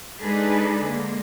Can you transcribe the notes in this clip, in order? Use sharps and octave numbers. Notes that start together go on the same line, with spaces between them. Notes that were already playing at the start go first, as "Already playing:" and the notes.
G#3 D4 D#4 G#4 A4 B4
D3 G#3 A#3